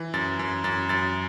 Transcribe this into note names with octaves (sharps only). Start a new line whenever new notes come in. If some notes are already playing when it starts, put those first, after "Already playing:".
Already playing: E3
F#2 A6
F#2
F#2 A6
F#2 A6